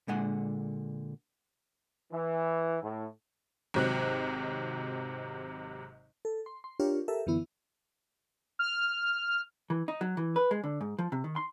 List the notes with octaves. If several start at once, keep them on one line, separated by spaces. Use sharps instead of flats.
A#2 D3 G#3 F#5
E3
A2
G#1 G#2 C3 F#3 F#6
A4
C6
C6
D4 F4 G4 A#4 C#5 F5
G4 A4 A#4 E5
F#2 D3 E3 B3 E4
F6
E3
D#4
F#3
E3
B4
G#3
D3
G#2
F3
C3
D#3
C6